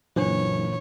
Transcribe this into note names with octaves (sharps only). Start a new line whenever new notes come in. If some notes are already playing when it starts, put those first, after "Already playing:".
F#1 A#2 E3 D4 C5 C#5